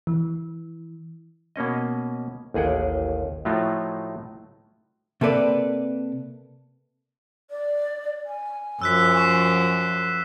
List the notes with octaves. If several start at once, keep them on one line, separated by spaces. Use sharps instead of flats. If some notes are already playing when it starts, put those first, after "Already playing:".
E3
B2 A#3 C#4 D#5
A1 D#2 G#4 F#5 G5
A2 F3 F#3 A3 D#4 F4
C3 A#3 A4 B4 D5
D5
G#5
F#2 F3 E6 F#6 B6
C#6 C7